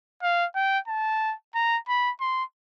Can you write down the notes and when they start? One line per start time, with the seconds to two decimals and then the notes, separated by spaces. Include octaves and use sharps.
0.22 F5
0.55 G5
0.88 A5
1.55 A#5
1.88 B5
2.21 C6